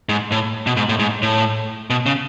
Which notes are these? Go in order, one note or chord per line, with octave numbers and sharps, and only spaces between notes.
G#2
A2
B2
G#2
A2
G#2
A2
B2
C#3